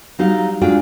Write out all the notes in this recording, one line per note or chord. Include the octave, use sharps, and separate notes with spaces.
F#3 G3 D#4 G4 F5
G#3 D4 F4 F#4 G#4 G5